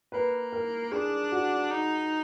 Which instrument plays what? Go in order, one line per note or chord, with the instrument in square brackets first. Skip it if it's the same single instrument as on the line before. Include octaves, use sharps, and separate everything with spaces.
[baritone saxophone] A#3 [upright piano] B4
[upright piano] A#4
[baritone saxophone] D4 [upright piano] G#4
[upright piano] F#4
[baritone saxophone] D#4